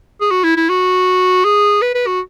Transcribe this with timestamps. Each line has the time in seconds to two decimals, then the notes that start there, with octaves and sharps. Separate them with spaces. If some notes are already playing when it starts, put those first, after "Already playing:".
0.21 G#4
0.31 F#4
0.44 E4
0.57 E4
0.69 F#4
1.45 G#4
1.82 B4
1.95 B4
2.07 F#4